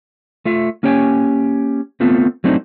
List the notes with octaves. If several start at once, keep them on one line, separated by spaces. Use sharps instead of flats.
A3 F4 E5
A#3 C#4 G4 C#5 G5 G#5
A3 B3 C4 F4 A4
F#3 A3 C4 D4 D#4